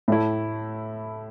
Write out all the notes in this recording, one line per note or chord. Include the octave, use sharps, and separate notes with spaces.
A2 A3 E4